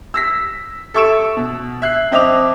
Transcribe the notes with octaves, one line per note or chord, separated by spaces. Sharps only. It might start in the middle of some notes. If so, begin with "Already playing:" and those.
E6 A#6 B6
A4 E5 C#6 E6 D7 E7
B2
E5 F#6 C7
F2 C4 D#5 E5 D6 F7